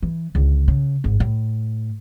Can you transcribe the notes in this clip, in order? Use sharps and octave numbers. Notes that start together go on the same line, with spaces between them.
E3
C#2 D3
C#3
G#1 G#2
A2